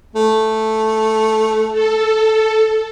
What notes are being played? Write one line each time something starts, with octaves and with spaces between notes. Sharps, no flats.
A3
A4